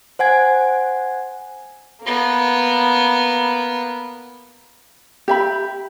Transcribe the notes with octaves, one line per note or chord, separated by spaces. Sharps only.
C5 F#5 G#5 G#6
A#3 B3
G4 E5 B5